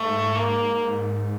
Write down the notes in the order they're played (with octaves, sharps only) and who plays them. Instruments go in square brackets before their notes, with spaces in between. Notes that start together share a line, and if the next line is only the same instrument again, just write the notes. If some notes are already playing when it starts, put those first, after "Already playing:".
Already playing: [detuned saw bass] G#2 [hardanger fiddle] A3
[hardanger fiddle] A#3